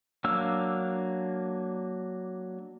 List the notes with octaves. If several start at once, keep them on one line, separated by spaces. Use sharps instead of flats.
F#3 A#3 D4 F5 E6